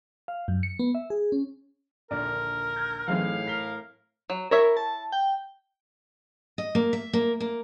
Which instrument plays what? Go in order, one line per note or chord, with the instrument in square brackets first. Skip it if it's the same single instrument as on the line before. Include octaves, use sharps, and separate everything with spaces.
[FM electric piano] F5
F#2
C#7
B3
E5
G#4
C#4
[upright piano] A#1 D#2 D3 [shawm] A#4 [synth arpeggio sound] D5
[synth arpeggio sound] G6 G#6
[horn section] A2 F5 [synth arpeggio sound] E3 F#3 C4 [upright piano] D#4 G#4 B4
[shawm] A#4 [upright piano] B6 G7
[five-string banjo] F#3
[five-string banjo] E4 C#5 E5 [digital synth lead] A#4
[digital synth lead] A5
G5
[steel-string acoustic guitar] D#5
A#3
E5
A#3
A#3